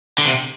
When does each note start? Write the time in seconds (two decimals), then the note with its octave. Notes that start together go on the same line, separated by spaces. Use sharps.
0.18 D3
0.26 C3